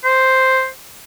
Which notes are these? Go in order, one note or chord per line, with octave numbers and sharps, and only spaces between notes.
C5